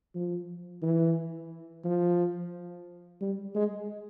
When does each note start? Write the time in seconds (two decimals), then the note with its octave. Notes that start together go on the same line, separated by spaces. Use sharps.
0.15 F3
0.83 E3
1.84 F3
3.21 G3
3.55 G#3